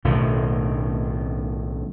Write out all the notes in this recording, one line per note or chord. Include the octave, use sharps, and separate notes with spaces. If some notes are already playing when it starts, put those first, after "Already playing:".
B1 A2 D#3